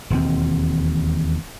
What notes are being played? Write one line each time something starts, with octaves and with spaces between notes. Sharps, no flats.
E1 D#2 C4